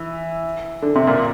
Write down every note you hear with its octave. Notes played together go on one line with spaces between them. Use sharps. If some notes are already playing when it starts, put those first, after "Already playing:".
Already playing: E3
D3
C3
A#2